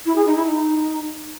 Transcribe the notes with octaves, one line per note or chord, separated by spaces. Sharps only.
E4
G#4
D#4
E4
D#4